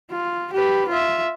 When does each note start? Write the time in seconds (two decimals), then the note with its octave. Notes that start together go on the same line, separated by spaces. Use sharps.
0.11 F4
0.53 G4 B4
0.89 F4 E5